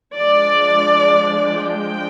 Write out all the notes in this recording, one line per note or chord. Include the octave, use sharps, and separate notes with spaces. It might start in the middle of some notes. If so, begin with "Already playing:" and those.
F3 G#3 D4 D5
G5